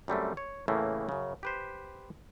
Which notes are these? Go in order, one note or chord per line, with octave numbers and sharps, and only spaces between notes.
F#2 G3 A3 C4
C#5
A2 C#3 E3 A3 A#3
F#2 C#3
G4 B4 C5